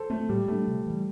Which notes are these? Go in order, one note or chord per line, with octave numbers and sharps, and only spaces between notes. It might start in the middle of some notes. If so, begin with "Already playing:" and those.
Already playing: A4 C5
A3 C4
A2 G3
G3 A3 D4
C3
E3 G3